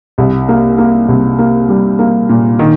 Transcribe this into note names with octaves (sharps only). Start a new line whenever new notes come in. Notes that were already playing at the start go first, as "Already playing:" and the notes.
C2
A#3
A#3
C2
A#3
G3
A#3
A#2
D#3